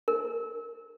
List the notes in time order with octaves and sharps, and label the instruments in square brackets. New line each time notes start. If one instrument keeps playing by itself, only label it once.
[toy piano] A#4